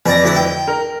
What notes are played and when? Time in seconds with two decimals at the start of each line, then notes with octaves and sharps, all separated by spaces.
0.06 F2 B4 D5 A#5
0.24 D2 E4 B4
0.36 G5
0.68 A#4